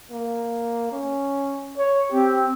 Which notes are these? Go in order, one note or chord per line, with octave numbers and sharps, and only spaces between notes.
A#3
C#4
C#5
C4 G4